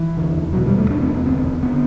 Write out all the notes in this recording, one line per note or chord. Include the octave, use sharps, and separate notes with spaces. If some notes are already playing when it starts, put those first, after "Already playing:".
Already playing: E3
E2 D3
E2 B2 F#3
G3
A3
E2 B2 D4
C4
B3
E2 D3 C4
D3 B3